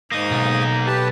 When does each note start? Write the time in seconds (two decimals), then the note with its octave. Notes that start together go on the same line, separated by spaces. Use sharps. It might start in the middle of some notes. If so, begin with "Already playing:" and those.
0.12 G#2 A#3 D#4 D#6
0.31 B1
0.87 G4 B4 A5